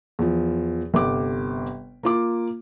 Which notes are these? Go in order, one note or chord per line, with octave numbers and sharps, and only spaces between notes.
E2 F3
G1 C3 D6
A#3 F4 D6